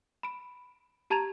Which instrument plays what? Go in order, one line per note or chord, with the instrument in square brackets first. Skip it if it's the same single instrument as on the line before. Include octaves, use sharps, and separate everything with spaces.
[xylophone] B5 D7
G4 A5 A#5 G#6 A6 F7